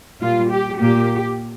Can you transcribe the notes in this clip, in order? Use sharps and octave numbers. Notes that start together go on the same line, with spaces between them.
A#2 G3 A#3 F4
G4
A#2 A#3 G4